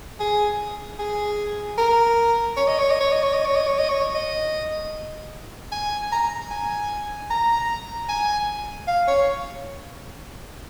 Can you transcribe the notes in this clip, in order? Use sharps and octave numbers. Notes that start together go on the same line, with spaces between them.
G#4
G#4
A#4
C#5
D#5
C#5
D#5
C#5
D#5
C#5
D#5
C#5
D#5
C#5
D#5
C#5
D#5
G#5
A#5
G#5
A#5
G#5
F5
C#5